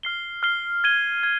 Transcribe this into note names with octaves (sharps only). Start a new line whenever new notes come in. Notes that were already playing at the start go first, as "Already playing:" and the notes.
F6 C7 G7
F6 C7 G7
G#6 D#7 G7
G#6